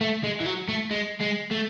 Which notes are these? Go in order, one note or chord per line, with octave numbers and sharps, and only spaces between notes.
A3
G#3
E3
F#3
A3
G#3
G#3
A3